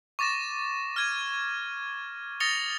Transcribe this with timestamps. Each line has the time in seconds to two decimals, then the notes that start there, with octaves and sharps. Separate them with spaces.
0.19 C#6 D6 A6 A#6 E7
0.96 F6 G#6 D#7
2.40 D#6 A6 A#6 C#7 F7 G7